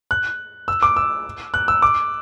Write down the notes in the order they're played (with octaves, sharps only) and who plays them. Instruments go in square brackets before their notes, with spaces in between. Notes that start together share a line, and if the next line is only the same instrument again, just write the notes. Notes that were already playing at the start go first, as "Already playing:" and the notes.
[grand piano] F#6
E6
D6
E6
F#6
E6
D6